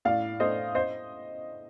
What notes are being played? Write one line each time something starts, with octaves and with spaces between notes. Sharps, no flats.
A2 D5 F5
A3 D4 C5 D#5
C5 D#5